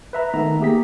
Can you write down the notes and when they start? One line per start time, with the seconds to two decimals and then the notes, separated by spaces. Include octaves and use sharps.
0.13 B4 E5 A#5
0.34 D#3 A3 B3 D#4 E5 A#5
0.61 A#3 G4 G#4 A#5 B6